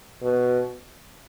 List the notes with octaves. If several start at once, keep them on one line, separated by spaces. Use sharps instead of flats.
B2